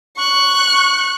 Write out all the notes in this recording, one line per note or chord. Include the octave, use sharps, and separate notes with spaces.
C#6 F#6